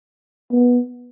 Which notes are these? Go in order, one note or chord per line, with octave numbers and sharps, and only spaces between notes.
B3